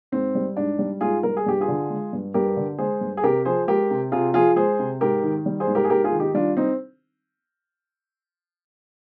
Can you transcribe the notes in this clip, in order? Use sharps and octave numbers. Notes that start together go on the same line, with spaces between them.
G#2 C4
G3
G#2 D4
G3
G#2 F4 G#4
G3 A#4
G#4
G2 G4
F4 G#4
D3
G#3
G2
G2 G4 A#4
D3
G#3 G#4 C5
G2
G#4
C3 G4 A#4
F3 G#4 C5
G#3 G4 A#4
C3
C3 F4 G#4
F3 F4 G#4
G#3 G#4 C5
C3
G#2 G4 A#4
D#3
G3
G#4 C5
G#2
G4 A#4
G#4
G#2 G4 A#4
F4 G#4
D#3
D#4 G4
G3 D4 F4
C4 D#4